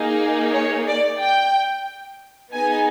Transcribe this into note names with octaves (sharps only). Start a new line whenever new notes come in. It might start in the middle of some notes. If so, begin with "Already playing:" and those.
Already playing: A#3 D#4 G#4
C#5
D5
G5
B3 D#4 G#4 G#5